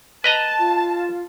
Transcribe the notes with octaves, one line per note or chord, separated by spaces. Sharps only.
B4 D#5 A5 A#5
F4